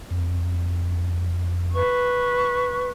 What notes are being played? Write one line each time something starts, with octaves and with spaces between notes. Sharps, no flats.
F2
B4 C#6